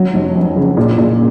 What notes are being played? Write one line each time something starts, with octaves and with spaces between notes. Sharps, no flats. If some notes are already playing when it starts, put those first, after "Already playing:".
Already playing: F#3
F1
F2
C#3
A#2
A#2